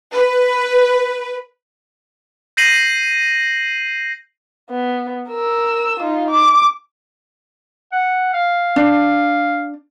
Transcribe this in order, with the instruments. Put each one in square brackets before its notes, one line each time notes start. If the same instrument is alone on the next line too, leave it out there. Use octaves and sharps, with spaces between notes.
[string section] B4
[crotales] G6 A#6 C7 D#7 F#7
[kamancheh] B3
A#4 E6
D#4 F4
D6
[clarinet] F#5
F5
[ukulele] D4